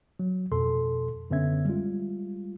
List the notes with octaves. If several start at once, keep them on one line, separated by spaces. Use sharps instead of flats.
F#3
F2 B2 A4 C6
F#2 D3 B3 C#4 E5 G#6
G3 G#3 F4